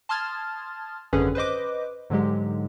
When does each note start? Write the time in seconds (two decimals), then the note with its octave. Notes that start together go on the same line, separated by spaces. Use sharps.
0.09 A5 C6 D#6 F6 G#6 A6
1.13 G#1 F#2 D3 C#4 G#4 B4
1.35 B4 C5 D#5 D6
2.10 G#2 D3 F#3 G#3 G4